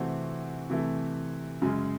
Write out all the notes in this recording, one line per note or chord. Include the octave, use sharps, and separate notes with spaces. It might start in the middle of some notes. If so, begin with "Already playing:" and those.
Already playing: C3 E3 A3 C4 F#4
C3 E3 A3
F#2 C#3 G#3